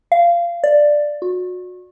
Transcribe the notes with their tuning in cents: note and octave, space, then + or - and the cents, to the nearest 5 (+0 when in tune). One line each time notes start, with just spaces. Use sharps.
F5 -20
D5 +5
F#4 -30